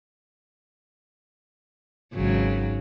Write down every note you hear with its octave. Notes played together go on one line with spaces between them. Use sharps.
G#1 C#3 F#3